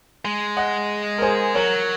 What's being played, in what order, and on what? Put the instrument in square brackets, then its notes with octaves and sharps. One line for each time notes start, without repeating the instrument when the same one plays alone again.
[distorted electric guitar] G#3
[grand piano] D#5 F#5
A#4
G#4 C5
[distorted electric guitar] F#3 [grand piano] A#4 C#5